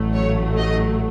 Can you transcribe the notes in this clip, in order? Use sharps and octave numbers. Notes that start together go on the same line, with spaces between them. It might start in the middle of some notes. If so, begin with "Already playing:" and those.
Already playing: A1 A2 F#3 A3
C#5
D#5